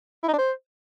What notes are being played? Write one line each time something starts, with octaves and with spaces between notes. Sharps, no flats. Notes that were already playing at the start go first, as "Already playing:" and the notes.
E4
D#4
D4
C5